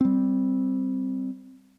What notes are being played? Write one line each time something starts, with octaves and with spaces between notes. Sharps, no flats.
G3 C4